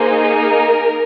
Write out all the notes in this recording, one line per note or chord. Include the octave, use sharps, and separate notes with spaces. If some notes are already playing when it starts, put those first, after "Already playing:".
Already playing: A#3 D#4 G#4 C5
A#4